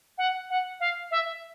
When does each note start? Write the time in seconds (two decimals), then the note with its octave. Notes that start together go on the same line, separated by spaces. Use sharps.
0.18 F#5
0.50 F#5
0.80 F5
1.11 E5